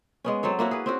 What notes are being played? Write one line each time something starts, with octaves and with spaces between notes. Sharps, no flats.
G#3 B3 C#4
F#3 C4 A4 C#5
A#3 E4 F#4 C#5
G#4 B4
C4 C#4 F#4